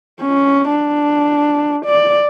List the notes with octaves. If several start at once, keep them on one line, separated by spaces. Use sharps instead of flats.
C#4
D4
D5